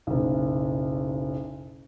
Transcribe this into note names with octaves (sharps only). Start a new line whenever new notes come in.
F#1 B1